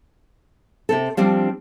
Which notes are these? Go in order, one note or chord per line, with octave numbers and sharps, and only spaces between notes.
C3 C4 A4
F3 G3 C4 D4